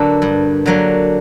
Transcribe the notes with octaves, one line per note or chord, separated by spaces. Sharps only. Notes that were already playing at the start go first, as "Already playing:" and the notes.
Already playing: D3 F#3 A#3 A4 B4 D5
G2
D3 F#3 A#3